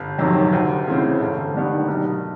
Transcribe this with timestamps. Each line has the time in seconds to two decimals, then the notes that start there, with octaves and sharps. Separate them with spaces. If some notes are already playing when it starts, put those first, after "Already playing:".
Already playing: G1
0.18 F2 C3 D#3 F#3
0.52 D2
0.87 C#3 E3 A3 C4
1.21 G1
1.54 G2 D#3 G3 B3
1.88 B1